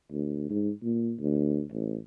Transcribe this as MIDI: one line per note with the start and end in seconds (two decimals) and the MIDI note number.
0.12 0.47 38
0.50 0.71 44
0.83 1.14 46
1.20 1.62 38
1.72 1.98 33